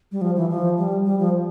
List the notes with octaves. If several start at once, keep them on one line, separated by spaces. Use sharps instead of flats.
G3
F3
E3
F3
G3
G3
F3